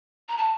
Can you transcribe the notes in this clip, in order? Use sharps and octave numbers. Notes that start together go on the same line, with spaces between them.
A#5
A5